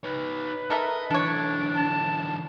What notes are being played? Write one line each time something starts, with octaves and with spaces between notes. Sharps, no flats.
D#4 B4 C#5
A4 A#4 D#5 E5
D3 E3 D4 A4 C#5
A5